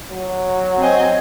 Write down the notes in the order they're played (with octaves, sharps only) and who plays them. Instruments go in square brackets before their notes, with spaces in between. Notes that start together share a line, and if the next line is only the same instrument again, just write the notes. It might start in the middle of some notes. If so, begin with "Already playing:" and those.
[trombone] F#3
[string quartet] C4 D#5 G#5